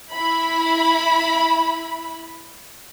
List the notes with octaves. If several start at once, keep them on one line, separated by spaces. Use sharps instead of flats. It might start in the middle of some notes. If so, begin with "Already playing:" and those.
E4 B5